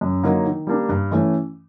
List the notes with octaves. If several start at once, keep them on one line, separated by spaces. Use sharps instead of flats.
F#2
D3 F#3 A#3 D#4
D#3
G3 A#3 D4
G2
E3 A3 C#4